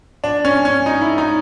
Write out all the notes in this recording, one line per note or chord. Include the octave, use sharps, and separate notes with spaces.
D4
C#4
C#4
D#4
E4
D#4